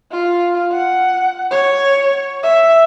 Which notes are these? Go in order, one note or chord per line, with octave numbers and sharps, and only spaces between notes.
F4
F#5
C#5
E5